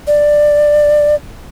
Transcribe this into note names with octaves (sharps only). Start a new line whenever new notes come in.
D5